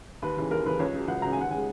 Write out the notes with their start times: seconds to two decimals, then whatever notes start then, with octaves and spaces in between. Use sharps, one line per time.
0.22 D#2 B4
0.37 C#3 E3
0.51 D#2 A#4
0.66 C#3 E3 B4
0.79 C#2 C#5
0.94 C#3 F#3
1.08 C#2 F#5
1.22 C#3 F#3 A#5
1.32 G#5
1.37 D#2 F#5
1.51 C#3 G#3 G#5